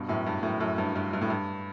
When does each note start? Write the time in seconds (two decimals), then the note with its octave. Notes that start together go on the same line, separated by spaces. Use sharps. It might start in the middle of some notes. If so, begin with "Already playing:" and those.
Already playing: G2 B2
0.09 F#2 A2
0.27 G2
0.43 F#2 A2
0.60 F#2 A2
0.78 G2
0.96 G2
1.13 G2
1.21 A2
1.30 G2